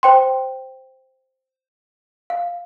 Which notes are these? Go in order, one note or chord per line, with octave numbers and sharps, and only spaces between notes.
C5 G5 C6
F5